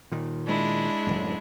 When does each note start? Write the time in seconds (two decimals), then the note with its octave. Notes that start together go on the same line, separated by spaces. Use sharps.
0.12 A#2 D#3
0.47 G#3 D4 E4
1.07 D1 G#1 F#2